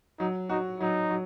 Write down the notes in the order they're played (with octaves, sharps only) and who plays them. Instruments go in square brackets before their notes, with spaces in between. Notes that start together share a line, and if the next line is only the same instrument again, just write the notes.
[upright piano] F#3 [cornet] D#4
[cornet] D#4 [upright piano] F#4
[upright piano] F#3 [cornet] D#4
[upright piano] F#3